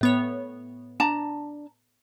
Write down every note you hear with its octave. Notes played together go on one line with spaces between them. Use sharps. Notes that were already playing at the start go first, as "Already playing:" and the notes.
A2 B3 C#5
D4 A5 A#5